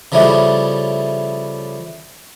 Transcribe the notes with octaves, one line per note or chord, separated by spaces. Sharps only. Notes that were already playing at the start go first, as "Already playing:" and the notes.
C#3 F3 G3 A3 E4 G4